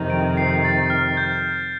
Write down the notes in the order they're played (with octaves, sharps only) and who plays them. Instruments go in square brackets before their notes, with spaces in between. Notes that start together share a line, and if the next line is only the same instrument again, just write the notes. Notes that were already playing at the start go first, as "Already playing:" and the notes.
Already playing: [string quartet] F2 C3 D#3
[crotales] D7
C7
A6
F6
G6